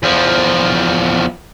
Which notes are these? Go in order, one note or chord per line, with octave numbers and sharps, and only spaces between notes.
E2 F3